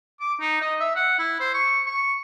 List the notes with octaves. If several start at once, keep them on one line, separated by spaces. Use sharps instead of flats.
D6
D#4
D#5
E5
F#5
E4
C5
C#6
C#6